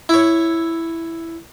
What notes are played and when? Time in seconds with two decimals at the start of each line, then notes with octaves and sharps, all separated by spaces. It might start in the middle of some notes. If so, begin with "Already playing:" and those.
0.09 E4 C#5